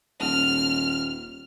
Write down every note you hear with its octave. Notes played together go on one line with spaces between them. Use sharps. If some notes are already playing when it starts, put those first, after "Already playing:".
D#1 F6